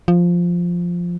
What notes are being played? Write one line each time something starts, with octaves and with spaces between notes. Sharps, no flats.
F3